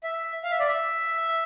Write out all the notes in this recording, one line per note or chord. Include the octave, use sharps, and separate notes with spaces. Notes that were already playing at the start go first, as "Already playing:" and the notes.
E5
F5
E5
D5
E5